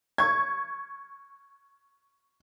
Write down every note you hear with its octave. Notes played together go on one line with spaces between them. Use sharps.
C#6 G#6